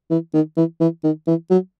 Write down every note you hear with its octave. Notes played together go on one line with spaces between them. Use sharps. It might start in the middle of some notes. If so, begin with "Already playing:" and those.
E3
D#3
E3
E3
D#3
E3
F#3